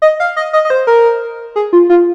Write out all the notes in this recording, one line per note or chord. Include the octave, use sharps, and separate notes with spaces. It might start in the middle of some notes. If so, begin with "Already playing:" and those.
D#5
F5
D#5
D#5
D#5
C5
A#4
G#4
F4
F4